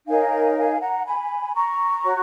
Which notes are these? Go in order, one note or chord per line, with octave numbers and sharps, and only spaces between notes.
D#4 A#4 C#5 F5 G#5
F5 G#5
F#5 A#5
G#5 B5
A#5 C#6
F#4 C#5